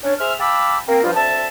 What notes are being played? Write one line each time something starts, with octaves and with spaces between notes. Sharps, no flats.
C#4 D4 C#5
G#4 C5 E5 F6
F5 G5 A5 B5 D6 E6
A#3 C4 G5
G2 F3 F4
D2 C4 E5 A5